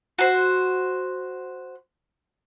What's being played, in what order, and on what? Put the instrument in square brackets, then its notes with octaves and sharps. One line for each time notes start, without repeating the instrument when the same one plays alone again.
[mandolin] F#4 C5